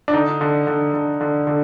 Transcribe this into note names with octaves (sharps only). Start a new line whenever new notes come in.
D4
D3 D#4
D3
D3
D3
D3
D3